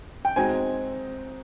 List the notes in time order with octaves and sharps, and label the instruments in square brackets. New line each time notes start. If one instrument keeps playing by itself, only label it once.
[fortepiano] G5
[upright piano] G#3 C4 D#4 F#4 [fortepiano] G#5